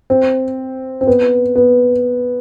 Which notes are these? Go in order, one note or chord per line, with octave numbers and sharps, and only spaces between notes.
C4
C4
B3
B3